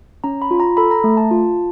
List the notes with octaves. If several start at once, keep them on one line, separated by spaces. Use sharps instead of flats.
C#4 A#5
B5
F4
A#5
A4 B5
A#5
A3
A5
F4